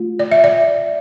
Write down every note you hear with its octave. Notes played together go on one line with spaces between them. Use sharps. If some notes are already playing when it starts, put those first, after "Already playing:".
Already playing: A3 F4
D5
E5
D5